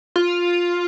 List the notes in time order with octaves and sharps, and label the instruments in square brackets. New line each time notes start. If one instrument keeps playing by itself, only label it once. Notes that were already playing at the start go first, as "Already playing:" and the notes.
[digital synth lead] F4